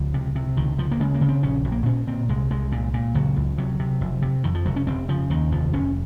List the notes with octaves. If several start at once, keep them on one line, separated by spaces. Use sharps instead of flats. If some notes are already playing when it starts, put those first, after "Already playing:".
Already playing: C#2 F3
C3
C3
C#2 D#3
C#2 F3
A#3
C#3 G#3
A#3
C#3
C4
A#1 C#4
A#1
A#3
A#2 C#4
A#2 C4
C2 G#3
C2 G#3
A#2
A#2
C#2 F#3
C#2
C3 F#3
C3
F1
C3
F2 D#3
F3
F1 F#3
C#4
F1 C4
C#3 F3
D#2 D#3
F1 F3
F1 C#4